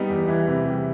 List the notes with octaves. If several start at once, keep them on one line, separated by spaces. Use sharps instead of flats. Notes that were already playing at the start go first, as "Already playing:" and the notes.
Already playing: G3 B3 D#4
E2
E3
C3
G3